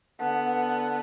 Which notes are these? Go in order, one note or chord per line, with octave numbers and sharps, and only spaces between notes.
D3 B3 F#5 A5